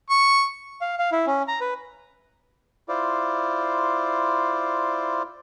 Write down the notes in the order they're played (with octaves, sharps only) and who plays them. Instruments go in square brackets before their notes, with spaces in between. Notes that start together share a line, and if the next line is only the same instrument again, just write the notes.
[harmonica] C#6
[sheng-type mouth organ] F5
F5
E4
C#4
A#5
B4
[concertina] E4 F4 C5 D5